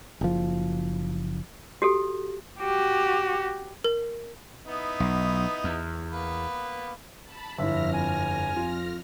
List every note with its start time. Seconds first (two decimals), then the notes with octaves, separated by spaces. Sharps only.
0.21 F#1 F3
1.82 F#4 G4 A4
2.60 F#4 G4
3.84 A#4
4.66 B3 D#4 E4
5.00 B1
5.64 E2
6.12 A#3 B3 B4
7.24 A5 B5
7.58 G1 F2 E4 E5 F6 A#6
7.93 G#5
8.56 F4